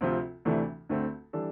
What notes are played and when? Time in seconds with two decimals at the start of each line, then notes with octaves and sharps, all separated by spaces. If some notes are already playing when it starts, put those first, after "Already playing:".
0.01 D2 C3 F3 C4 F4
0.45 D2 C3 E3 A3 D4
0.89 D2 D3 A3 C4
1.33 E3 G3 D4 A4